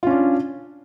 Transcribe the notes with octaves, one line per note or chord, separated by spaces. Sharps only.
C#4 D4 F4